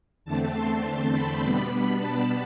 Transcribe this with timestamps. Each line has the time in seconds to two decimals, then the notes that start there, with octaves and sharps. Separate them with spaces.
0.25 E2 D3 A3 C4 A5
0.54 C6
0.84 C6
1.13 B5
1.42 B2 G3 B3 D4
2.01 A5